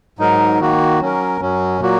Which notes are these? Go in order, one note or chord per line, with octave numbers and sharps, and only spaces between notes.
G#2 F#3 D#4 A#4
D#3 A#3 F#4
F#3 C#4 A#4
F#2 F#3 C#4
A#2 F#3 A#3 F#4